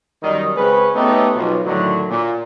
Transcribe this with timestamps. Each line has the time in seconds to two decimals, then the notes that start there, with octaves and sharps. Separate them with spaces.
0.23 F#2 D#3 G3 D#4
0.56 C#3 G#3 C4 C#4 B4
0.94 A3 B3 C#4 D#4 G4 A4
1.35 B1 B2 F3
1.65 A2 D3 D#3 F#3
2.09 A#2